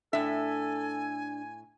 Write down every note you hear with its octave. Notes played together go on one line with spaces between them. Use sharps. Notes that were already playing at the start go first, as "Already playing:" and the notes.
A2 D4 A4 E5 G#5